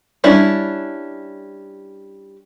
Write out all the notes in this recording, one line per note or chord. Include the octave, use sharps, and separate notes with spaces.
G3 C#4 D4 E4